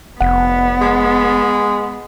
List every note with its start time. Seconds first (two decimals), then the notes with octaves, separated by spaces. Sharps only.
0.21 F1 B3 F#5
0.81 G#3